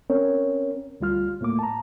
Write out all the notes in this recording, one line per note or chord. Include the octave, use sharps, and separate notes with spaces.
C4 C#4 A#4 C#5
D2 G3 F4 F6
A2 A3 A#3 D6
A5 A#5